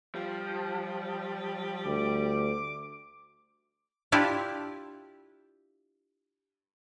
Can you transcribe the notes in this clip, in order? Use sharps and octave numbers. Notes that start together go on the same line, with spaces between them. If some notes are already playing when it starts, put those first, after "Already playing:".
F3 G3
D2 D6
D4 E4 F4 G4